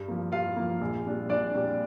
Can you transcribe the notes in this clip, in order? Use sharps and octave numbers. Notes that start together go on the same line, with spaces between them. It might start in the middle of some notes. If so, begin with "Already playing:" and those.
Already playing: G2
F3 A#3
G2 F4 F5
F3 A#3
A#1
A#2 G3 D4
A#1 D4 D5
A#2 G3 D4